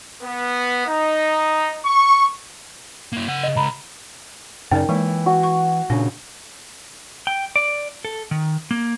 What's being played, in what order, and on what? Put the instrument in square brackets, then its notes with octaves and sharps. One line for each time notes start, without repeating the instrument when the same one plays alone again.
[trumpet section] B3
D#4
C#6
[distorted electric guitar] A#3 E4
C#3 F#5
[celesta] D#5
[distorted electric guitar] C#2 [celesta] A#5 B5
[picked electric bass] F#2 C#3 [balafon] D#4 A#4 D5 [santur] G5
[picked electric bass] E3 [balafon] G#3 A#3
[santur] F#4
[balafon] C#6
[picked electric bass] A#2 C#3 [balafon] D4
[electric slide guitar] G5
D5
A4
D#3
A#3